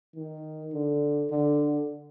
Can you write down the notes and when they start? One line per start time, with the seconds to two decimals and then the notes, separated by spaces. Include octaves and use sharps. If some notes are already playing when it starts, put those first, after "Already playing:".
0.16 D#3
0.73 D3
1.30 D3